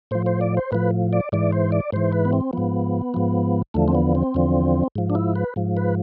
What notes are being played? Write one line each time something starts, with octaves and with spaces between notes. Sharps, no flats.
A2 F3 C5
C5
D5
C5
A2 F3 B4
D5
G#2 E3 D5
C5
D5
G#2 E3 C5
B4
B3
C4
G#2 F3 B3
G#2 F3
E2 D3 F3 A3
C4
B3
C4
E2 D3 F3
G#2 F3
D4
E4
B4
G#2 F3
B4